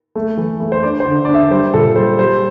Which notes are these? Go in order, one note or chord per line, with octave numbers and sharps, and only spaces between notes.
A3
E3
A3
C5
D4 D5
C5
D3
D4 D5
E5
G3 C5
A#2 A4
G3 C5
G3 C5